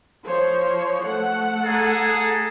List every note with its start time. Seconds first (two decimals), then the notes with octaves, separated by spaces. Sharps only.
0.25 F3 C5 C#5
1.03 A3 F#5
1.64 G#4 A4 A#5